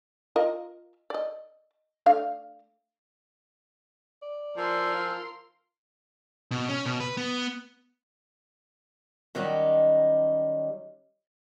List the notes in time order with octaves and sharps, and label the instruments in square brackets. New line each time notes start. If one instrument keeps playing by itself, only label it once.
[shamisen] F4 A#4 D#5
D5 D#5
A3 D4 F5
[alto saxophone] D5
[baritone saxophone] F3 [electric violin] A#4 C6 [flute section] G#5 E6
[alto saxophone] F4
[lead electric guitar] B2
C#4
B2
B4
B3
[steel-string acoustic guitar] D#3 F#3 G3 C#4 D#4